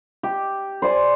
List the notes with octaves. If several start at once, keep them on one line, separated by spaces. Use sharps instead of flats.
G4
C5 D5 G#5